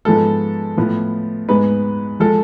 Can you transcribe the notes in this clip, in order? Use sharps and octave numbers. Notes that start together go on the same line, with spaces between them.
G#2 F3 G#3 B3 A4
A2 F3 B3
G#2 G#3 B3 B4
F3 G#3 A4